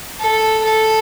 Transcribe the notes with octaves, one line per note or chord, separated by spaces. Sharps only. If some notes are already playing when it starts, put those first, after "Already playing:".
A4
A4